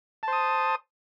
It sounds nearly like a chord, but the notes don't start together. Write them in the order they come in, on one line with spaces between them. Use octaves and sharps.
A5 C5 D#6